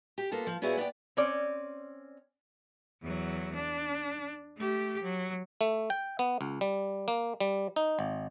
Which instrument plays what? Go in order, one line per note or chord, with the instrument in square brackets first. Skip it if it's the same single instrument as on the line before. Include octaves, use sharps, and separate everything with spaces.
[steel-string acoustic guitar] G4
A#3 B3 F4 A4
F3
A#2 B3 E4 F#4 G#4 C#5
B3 D5 D#5 G5
[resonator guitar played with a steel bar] C4 C#4 D5
[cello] E2 F#3
D4
A3 G4
F#3
[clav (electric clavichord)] A3
G5
B3
C#2
G3
A#3
G3
D#4
G#1